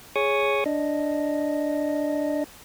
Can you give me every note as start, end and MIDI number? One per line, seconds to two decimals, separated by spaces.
0.16 0.64 68
0.16 0.64 73
0.16 0.64 85
0.16 0.64 87
0.66 2.44 62
0.66 2.44 75